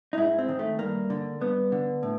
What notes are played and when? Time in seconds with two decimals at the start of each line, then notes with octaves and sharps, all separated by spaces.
0.13 D#4
0.18 G#2 E4
0.38 C4
0.48 D#3
0.59 A3
0.79 G2 A#3
1.10 D3
1.41 G2 B3
1.72 D3
2.03 A2